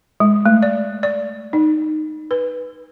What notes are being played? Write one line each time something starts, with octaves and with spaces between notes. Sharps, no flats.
G#3
A3
D5
D5
D#4
B4